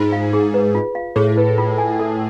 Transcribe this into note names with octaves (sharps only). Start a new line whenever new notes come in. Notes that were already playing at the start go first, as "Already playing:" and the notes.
Already playing: G#2 F4
F5
G#4
B4
F4
F5
A2 G#4
B4
F4
G#5
A4